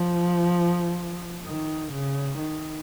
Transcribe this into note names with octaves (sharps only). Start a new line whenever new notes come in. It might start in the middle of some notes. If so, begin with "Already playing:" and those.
Already playing: F3
D#3
C#3
D#3